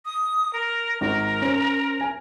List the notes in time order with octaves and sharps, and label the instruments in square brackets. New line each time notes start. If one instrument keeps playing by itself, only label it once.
[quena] D#6
A#4
[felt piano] G#1 [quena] A#4
[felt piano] C#4 C5
G#5